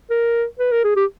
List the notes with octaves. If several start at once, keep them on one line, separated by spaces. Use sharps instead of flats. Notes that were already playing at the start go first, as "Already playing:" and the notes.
A#4
B4
A#4
G#4
G4